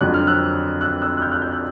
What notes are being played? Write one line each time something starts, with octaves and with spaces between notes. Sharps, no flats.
F2 D3 F#3 F#6
F6
E6 F#6
E6 F#6
E6 F#6
F#6
F6 G6
E6 F#6
F6 G6
E6 F#6